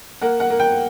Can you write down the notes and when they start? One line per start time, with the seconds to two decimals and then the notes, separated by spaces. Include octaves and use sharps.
0.22 A#3 F#5
0.40 F#5
0.50 A#3
0.60 G5